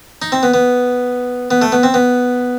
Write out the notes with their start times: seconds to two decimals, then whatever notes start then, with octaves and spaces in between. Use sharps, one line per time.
0.22 D#4
0.32 C4
0.43 B3
0.54 B3
1.51 B3
1.62 A3
1.72 B3
1.83 C4
1.94 B3